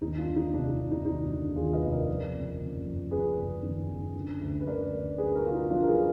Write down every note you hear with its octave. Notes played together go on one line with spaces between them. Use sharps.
D#2 D#4
D4 F4
D3
D#4
F1 D4
D#4
F1
D#4
D#2 D#4 F#4
D3
D#2 F4 G#4
B4 D#5
F1
A#4 D5
F2
F#1
F#1
F2
F#1 G#4 B4
F#1
D#3
F#1
D3
D2
B4
D2 A#4 D5
D2
D2 G#4 B4
F#4 A#4
D3 F4
D#4
F3 D4 F4
A#4
G#4 B4